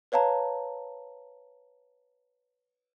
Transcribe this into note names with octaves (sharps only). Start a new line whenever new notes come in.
B4 C#5 F5 A5 A#5